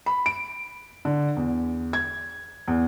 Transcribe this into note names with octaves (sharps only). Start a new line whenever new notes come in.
B5
D7
D3
E2
G#6
E2